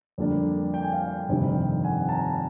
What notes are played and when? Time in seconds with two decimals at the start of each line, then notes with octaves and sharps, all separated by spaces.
0.18 F2 D3 G3 A#3 D4
0.74 G5
0.82 G#5
0.93 F5 G5
1.28 G1 F2 C3 D#3 G3
1.84 F#5 G#5
2.09 A5
2.12 G#5 A#5